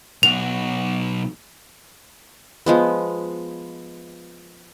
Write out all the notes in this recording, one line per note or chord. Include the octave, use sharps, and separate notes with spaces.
B1 F#4 F7
F3 G#3 B3